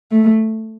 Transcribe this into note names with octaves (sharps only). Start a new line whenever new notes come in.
A3